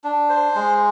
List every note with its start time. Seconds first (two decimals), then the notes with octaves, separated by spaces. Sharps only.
0.04 D4
0.29 C5
0.55 G#3